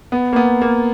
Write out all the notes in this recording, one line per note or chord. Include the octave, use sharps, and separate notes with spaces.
B3
A#3
B3
A#3